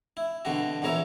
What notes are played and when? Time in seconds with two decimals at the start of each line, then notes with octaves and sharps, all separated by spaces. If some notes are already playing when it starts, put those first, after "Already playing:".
0.17 E4
0.45 B2 D3 G3 F#4
0.82 A#1 E2 E3 A#4 C#5 E5